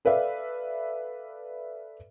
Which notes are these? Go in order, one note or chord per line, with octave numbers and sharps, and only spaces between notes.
A4 B4 D5 E5 F5